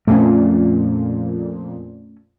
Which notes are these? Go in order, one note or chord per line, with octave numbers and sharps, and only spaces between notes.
F2 A#2 A3 C#4